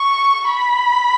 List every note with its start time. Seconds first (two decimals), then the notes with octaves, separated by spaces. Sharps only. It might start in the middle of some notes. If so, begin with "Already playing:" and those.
Already playing: C#6
0.47 B5